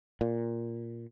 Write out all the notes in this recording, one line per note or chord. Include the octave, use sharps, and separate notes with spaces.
A#2